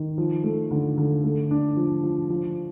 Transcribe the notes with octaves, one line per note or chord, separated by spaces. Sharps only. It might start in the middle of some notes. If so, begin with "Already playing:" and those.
Already playing: D#3
F3
A3
D3
D3
A3
D4
F3
F3
F3